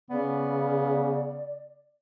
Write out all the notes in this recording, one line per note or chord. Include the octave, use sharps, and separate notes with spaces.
C#3 B3 D5